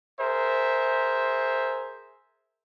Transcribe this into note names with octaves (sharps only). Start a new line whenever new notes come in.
G#4 A#4 C5 E5